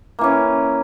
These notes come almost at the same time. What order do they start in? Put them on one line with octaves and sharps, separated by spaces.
A#3 E3 C#4